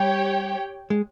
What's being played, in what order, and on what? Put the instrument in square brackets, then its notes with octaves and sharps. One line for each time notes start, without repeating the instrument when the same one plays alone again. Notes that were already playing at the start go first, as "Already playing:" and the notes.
Already playing: [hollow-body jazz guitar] G3 [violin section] G4 C#5 G5
[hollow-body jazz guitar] G#3